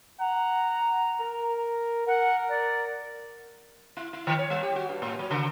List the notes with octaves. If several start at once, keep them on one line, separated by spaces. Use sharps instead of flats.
F#5 A#5
A#4
A#4 F#5
D5
E4
E4
D#3
C#5
G3
G4
F#4
G2
A2
F#3
C#3